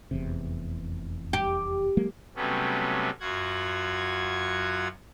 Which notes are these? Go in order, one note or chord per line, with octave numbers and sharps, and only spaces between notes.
F1 E2 C3
G4
F#3 G#3 A#3
C3 F#3 G3 A3 B3 C#4
F#2 F4 F#4 F#5 G#6